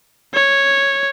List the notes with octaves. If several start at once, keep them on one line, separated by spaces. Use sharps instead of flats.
C#5